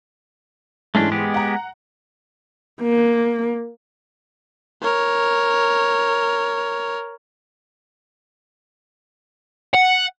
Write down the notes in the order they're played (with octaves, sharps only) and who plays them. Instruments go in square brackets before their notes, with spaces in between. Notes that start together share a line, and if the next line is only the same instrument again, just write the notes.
[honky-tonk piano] G#2 E3 [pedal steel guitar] A3 C#4 D4
[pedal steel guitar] G#3 B3 G4
[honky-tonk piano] F#5 A#5
[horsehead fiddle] A#3
[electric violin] A#4 C#5
[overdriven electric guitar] F#5